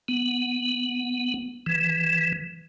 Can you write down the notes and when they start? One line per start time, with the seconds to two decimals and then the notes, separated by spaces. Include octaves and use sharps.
0.08 B3
1.66 E3